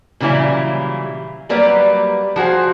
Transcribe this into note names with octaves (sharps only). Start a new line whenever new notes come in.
A#2 C#3 E3 F#3 G3 E4
F#3 G3 A#3 B4 D5
F3 F#4 G#4 C5